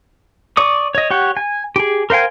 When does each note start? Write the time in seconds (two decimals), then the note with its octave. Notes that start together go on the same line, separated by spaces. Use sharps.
0.57 D5 C#6 D#6
0.95 C#5 D#5
1.11 G4 C#5 F#5
1.37 G#5
1.76 G4 G#4
2.10 A#4 C5 F5 G5 G#5